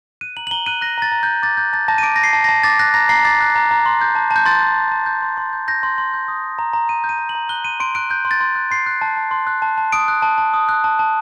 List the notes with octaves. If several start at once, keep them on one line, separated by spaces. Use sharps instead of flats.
F#6 D#7
A#5 F#7
F#7
A#5 G7
F#6 D#7
F#6 A#6
A#5 A6
A#5
F#6 G6
D6 A6
F#6 G6
A5 A6
A5 A#6
D#7
D6 D7
A#6
F#6 C7
A5
A5 A#6
D6 A6
F#6 A#6
A#5 A#6
A#5 C7
D6 A6
F#6
A#5
A#5
C6
G6
A5
A5
G6
C6 A6
G6
A5
A5
G6
C6
C6
G6
G6 A#6
C6
C6
G6
D#6
G6
A#5
A#5
D#6 D#7
G6
D#7
A#5
F#7
A#5
F#6 G7
C6 D#7
C6 D7
F#6 D7
F#6 G6
C6
A6
C6
F#6
C6 C7
F#6
A5
A5
C6
F#6
A5
A5
D#6 D7
F#6
A5
A5
D#6
F#6
A5
A5